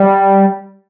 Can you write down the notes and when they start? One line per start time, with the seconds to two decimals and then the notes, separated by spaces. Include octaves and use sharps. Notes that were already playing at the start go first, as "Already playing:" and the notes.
Already playing: G3